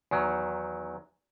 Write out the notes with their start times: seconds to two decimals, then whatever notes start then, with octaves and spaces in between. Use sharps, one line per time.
0.11 E2 D#3 F#3